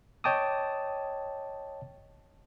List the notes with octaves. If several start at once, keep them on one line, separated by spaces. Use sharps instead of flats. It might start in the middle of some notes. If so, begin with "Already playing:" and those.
C#5 D#5 G5 A5 D6 D#6